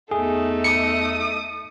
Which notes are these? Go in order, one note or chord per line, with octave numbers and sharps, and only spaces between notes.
E2 A3 D#4 G#4
D#6 C#7